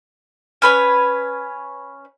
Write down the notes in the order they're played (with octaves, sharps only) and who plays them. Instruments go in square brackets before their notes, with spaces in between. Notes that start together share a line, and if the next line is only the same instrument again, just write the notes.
[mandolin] C#4 B4 C#5